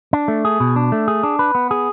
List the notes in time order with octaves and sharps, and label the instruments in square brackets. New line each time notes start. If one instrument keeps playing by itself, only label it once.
[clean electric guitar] D4
A3
G#4
B2
D4
A3
G#4
D4
B4
B3
G#4